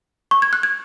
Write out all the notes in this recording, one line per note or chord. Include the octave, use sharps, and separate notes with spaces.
C#6
G#6
F#6
G#6